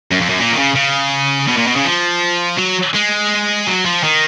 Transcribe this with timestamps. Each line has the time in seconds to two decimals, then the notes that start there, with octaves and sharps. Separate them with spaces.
0.11 F#2
0.20 F2
0.29 F#2
0.39 A#2
0.52 D#3
0.57 C#3
0.76 C#3
1.48 B2
1.57 A#2
1.67 B2
1.76 C#3
1.85 F3
2.58 F#3
2.95 G#3
3.67 F#3
3.86 F3
4.04 D#3